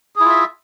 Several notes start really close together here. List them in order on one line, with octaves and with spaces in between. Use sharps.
G#4 E4 F4 E5